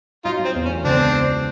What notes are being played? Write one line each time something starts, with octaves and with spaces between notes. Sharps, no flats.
F#3 D#4 F4
F#3
C4
E2
C#4
A3
C#2 C4 D4